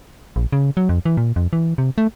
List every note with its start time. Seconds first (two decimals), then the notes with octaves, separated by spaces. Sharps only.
0.36 A#1
0.53 C#3
0.77 F#3
0.89 F2
1.06 E3
1.17 A#2
1.36 F2
1.53 E3
1.78 C3
1.98 A3